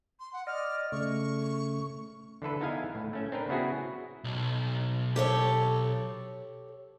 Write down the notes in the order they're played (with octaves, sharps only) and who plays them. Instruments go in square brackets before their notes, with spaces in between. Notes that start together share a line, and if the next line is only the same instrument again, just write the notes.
[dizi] C6
F#5
[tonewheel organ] D5 D#5 [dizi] F6
[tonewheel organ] C#3 A3 [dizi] C#6
[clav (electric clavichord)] D3 E3 A4 B4
B3 D#4 E4 G#4 F5 G#5
A2
A3 C#4 E5
C4 D4 A#4 B4
C#3 B3 E4 F#4 G#4
[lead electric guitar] B1
[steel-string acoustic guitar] G4 A4 C#5